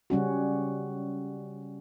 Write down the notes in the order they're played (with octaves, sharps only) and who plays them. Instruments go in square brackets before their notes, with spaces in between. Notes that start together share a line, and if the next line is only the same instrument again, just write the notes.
[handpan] C#3 G3 C#4 F#4